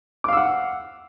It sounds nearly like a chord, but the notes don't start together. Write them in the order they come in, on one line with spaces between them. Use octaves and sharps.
D6 F5 E6 F#5